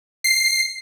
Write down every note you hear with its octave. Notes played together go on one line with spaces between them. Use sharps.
C7